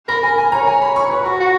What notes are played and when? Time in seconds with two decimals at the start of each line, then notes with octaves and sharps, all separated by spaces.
0.08 A#4 B5
0.23 A#4 G#5
0.38 G#5
0.52 C#5 A#5
0.67 G#5
0.82 B5
0.96 C#6
1.10 B4 C#6
1.25 F#4 C#6
1.40 F#4